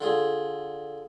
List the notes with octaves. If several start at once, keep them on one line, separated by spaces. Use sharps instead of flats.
D3 F4 G#4